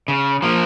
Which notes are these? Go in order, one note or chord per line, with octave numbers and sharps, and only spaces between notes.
C#3
F3 A#3